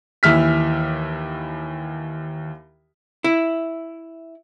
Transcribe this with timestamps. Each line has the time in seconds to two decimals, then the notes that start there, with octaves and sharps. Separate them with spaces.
0.23 D#2 E3 E5 F6 B6
3.24 E4